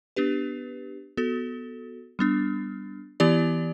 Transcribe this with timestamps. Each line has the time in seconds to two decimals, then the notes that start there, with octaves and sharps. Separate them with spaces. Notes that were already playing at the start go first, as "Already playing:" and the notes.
0.16 B3 D4 G4 B4
1.17 B3 F#4 A4
2.19 G3 B3 D4
3.20 E3 B3 E4 G4 D5